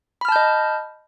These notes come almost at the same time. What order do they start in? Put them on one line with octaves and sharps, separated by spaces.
B5 F6 A5 G6 D#5